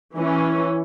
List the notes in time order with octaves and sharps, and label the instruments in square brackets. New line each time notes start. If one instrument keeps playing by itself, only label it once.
[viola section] E3 C#4